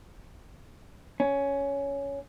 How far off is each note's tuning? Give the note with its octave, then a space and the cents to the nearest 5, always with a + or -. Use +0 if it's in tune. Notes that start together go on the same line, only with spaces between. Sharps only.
C#4 +10